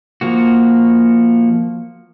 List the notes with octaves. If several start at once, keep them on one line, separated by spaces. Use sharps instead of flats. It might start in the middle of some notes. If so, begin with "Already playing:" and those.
F3 A#3 F#4